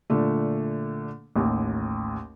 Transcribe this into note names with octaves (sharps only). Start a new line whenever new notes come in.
A#2 D3 A3
A1 D#2